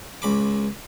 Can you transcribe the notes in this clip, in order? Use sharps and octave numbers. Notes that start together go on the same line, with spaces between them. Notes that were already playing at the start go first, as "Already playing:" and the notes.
C#2 B5 D6